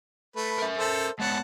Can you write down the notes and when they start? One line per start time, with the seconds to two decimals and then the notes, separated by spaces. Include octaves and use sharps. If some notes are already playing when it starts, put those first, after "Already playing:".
0.36 A3 B4
0.58 A#4 E5
0.77 A4 C5
1.20 G#3 B3 C#5 F#5 A5